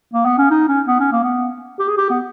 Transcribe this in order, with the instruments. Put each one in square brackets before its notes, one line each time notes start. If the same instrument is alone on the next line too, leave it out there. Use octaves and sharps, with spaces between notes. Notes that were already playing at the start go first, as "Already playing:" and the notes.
[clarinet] A#3
B3
C#4
D#4
C#4
B3
C#4
A#3
B3
G4
G#4
G4
B3